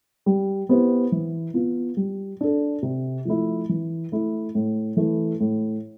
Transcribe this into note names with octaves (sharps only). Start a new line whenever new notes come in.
G3
B3 E4 G4 C5
E3
B3 F4
G3
D4 A4
C3
F3 A3 E4
E3
A3 E4
A2
E3 A3 E4 A4
A2